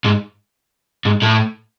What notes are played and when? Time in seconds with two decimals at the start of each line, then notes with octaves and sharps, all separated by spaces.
0.04 G#2
1.05 G#2
1.22 A2